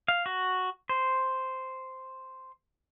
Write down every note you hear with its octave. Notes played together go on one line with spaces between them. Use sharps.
F5
F#4
C5